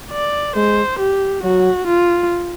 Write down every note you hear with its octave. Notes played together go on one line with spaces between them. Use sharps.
D5
G#3 C5
G4
F#3 F#4
F4